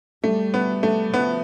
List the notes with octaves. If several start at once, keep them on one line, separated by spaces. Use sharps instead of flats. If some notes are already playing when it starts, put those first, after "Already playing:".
G3 A3
B3
A3
F3 B3